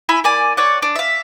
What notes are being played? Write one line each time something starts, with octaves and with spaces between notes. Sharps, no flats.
E4 G#5 B5
A#3 D5 G#5
C#5 D5 F#5
D4
E5 F5